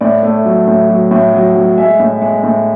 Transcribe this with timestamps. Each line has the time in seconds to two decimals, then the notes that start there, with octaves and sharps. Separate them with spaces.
0.01 A2 D5
0.23 A3
0.45 F#3
0.68 A2
0.89 F#3
1.11 A2
1.33 F#3
1.56 F#3
1.78 G#3 E5
2.00 A2
2.22 G#3
2.44 A2